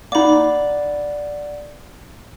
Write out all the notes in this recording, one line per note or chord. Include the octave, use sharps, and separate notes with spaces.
A#3 D#4 D5 F#5 B5 D6 A6